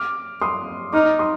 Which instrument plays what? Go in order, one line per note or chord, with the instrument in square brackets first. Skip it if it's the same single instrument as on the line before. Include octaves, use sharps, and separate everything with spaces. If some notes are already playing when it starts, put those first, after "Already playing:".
Already playing: [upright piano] D6 F6
C6 D#6
[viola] D#4 [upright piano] D6 F6
[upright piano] C6 D#6